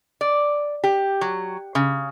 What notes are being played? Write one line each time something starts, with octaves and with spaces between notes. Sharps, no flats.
D5
G4
F#3
C#3